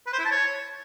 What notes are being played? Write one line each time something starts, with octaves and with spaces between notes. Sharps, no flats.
B4
C5
E4
A5
C#5